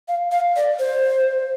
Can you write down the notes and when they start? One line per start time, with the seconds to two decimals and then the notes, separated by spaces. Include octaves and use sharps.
0.08 F5
0.32 F5
0.56 D5
0.79 C5